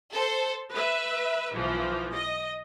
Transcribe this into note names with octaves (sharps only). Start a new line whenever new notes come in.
A4 C5
B4 E5
B1 E3 F3
D#5